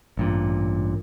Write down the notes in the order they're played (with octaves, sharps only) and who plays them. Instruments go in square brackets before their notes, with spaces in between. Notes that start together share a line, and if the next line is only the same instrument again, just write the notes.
[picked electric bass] A1 G2 A#2